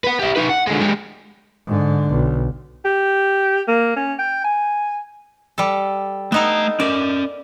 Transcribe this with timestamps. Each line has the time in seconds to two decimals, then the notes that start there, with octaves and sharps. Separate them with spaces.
0.04 B4 F#5
0.19 E4 G4
0.36 D#4 B4
0.49 F#5
0.67 D3 G#3
0.81 G#3 G4
1.67 G#2 D3
2.11 B1
2.85 G4
3.68 A#3
3.96 C#4
4.19 G5
4.44 G#5
5.58 G3 A4
6.32 A3 B3 D#4 A4 A#5
6.80 C#4 A#4 D5